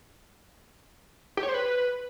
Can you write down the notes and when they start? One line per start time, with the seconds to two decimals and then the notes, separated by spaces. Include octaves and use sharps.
1.37 G4
1.43 C#5
1.48 C5
1.54 B4